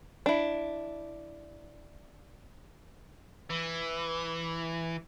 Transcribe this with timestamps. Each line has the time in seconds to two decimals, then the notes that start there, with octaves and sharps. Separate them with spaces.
0.26 D4 E4
3.50 E3